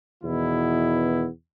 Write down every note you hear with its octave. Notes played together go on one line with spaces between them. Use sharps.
E2 B2 D#3 B3 E4